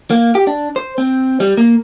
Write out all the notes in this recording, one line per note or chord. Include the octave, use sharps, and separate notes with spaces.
A#3
G4
D4
C5
C4
G3
A#3